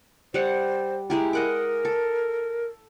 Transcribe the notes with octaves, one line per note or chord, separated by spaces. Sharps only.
G3 C5 F#5
G#3 E4 G4 A#5
A#4 D#5 F#5 D6
A4